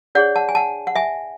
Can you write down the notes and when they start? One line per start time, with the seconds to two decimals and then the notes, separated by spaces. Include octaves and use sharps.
0.15 D4 G#4 C#5 D5 F#5
0.36 F#5 A5
0.49 G#5
0.55 F#5 A5
0.87 F#5
0.95 E5 G#5